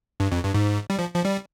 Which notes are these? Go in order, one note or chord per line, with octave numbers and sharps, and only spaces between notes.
G2
F2
G2
G#2
G3
F3
F3
G3